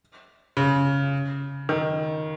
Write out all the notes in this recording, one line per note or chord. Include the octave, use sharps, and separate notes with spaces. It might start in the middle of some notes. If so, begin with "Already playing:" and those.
C#3
D#3